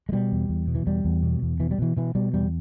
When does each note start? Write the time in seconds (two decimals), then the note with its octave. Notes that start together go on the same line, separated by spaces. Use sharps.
0.09 G#3
0.12 B2 G3
0.32 E2
0.49 E2
0.68 B2
0.75 E3
0.87 E2 G3
1.05 E2
1.23 B2
1.42 E2
1.60 B2 E3
1.71 G3
1.79 B2 E3
1.97 B2 E3
2.15 B2 G3
2.33 E2 G3